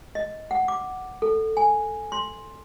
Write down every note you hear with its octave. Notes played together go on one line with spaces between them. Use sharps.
D#5
F#5
D6
A4
G#5
C6